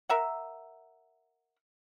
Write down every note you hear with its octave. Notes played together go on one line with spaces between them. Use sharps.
A#4 E5 F#5